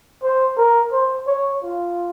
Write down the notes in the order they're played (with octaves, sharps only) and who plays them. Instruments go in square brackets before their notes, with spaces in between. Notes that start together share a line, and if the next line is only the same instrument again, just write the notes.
[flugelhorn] C5
A#4
C5
C#5
F4